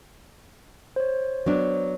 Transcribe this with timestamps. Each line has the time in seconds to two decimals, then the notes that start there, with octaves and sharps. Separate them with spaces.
0.96 C5 C#5
1.46 F#3 B3 D4